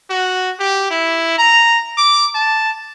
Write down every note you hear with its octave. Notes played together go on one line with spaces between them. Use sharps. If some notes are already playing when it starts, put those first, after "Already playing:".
F#4
G4
E4
A#5
D6
A5